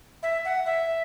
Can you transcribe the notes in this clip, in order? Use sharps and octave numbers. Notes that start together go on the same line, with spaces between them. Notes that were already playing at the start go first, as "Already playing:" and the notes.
E5
F#5
E5